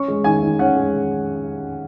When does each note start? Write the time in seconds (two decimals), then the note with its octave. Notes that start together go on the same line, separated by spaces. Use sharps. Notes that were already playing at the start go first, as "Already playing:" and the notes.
Already playing: C#4 C#6
0.08 G#3
0.24 D#3 G#5
0.42 D#3
0.59 C#4 F#5
0.76 G#3